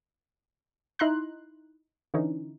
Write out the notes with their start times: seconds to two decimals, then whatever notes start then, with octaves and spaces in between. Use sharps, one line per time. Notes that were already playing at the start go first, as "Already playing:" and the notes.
0.99 D#4 E4 A#5 C6 F#6
2.14 D3 E3 C#4 D#4